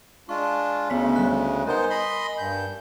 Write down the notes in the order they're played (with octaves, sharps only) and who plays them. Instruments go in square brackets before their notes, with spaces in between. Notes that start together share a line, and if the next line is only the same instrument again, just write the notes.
[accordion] G#3 D4 F4 [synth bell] C#6
[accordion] D2 C#3 G#3 [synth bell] B3 C#5 B6
[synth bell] G3 F#6
[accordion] B3 D#4 C5 [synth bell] A#4 G#5
[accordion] D#5 B5 C6
G2 G6